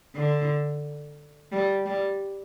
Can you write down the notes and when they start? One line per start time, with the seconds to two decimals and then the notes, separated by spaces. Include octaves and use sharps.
0.15 D3
1.52 G3
1.86 G3